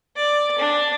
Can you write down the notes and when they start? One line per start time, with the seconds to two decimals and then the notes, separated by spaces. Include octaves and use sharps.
0.16 D5
0.59 D4